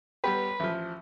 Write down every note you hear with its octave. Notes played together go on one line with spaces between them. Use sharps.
G3 B3 G4 B4
A1 F3